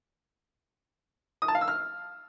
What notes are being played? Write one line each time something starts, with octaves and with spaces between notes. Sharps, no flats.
D#6
A5
F5
E6
F6